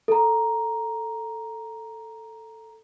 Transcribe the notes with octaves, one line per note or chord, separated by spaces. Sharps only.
A4 A#5